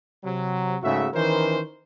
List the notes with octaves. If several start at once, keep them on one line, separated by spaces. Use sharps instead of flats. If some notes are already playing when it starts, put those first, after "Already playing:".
C3 F#3
G#2 C#3 A3 F#4 E5
D#3 E3 C#4 A#4 C5